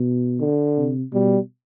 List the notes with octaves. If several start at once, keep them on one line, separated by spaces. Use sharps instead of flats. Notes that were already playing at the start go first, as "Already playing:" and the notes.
Already playing: B2
D3
C3
B2 G3